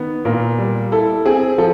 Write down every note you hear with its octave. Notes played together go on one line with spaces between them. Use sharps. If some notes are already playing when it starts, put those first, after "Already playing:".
Already playing: D#3 B3
A#2 A#4
G3
E4 A4
C4 G#4
F3 A4